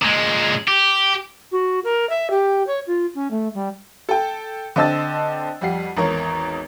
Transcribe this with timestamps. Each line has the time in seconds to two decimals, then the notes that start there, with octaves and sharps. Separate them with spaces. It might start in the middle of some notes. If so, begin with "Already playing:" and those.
0.02 A#2 G#3
0.68 G4
1.52 F#4
1.84 A#4
2.10 E5
2.30 G4
2.67 C#5
2.87 F4
3.15 C#4
3.31 A3
3.54 G3
4.09 A4 G5
4.76 D3 C4 D#5 A5 E6 A6
5.61 F2 G3 F#5 C7
5.97 G#1 E2 A#4 C#5